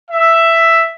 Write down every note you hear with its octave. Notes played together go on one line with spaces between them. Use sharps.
E5